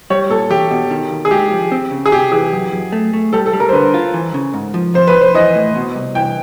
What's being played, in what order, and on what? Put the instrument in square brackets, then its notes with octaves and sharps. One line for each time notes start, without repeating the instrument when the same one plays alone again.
[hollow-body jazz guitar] G3 [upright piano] C#5
[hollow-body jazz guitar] A#2 [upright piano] A4
[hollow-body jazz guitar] E2 [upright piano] G4
[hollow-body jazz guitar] B2
D#3
D#2
[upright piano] G#4
[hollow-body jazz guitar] G#3 [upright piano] G4
[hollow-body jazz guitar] F3
C4
C#3
[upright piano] G#4
[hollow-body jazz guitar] C3 [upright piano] G4
[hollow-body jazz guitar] E3 [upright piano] G#4
[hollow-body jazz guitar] F#2
F#2
A3
A3
[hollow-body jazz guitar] G3 [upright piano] A4
[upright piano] A4
[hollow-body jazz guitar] G3
[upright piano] A#4
C5
[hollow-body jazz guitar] D3 [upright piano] B4
[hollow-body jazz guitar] F4
E3
C#3
G#2
F3
[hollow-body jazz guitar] F2 [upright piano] C5
[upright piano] B4
[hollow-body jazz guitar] F2
[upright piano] C5
[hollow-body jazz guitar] E3 [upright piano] D#5
[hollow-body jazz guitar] A2
B2
C2
[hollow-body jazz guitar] E3 [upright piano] G5